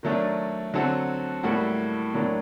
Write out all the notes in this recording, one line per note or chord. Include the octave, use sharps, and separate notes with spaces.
D#3 F#3 A3 D4
D3 F#3 C4 F#4 A4
A2 G3 A#3 F#4 A4
A2 F#3 A#3 D4